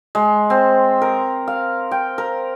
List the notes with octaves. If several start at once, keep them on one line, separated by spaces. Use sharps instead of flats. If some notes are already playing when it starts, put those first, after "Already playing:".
G#3
C4
A#4
F5
G5
A#4